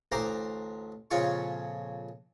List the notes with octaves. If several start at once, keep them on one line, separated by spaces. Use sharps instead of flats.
A1 D2 C5 A#5 C6 D6
F2 A#2 C#3 F4 G#5 C#6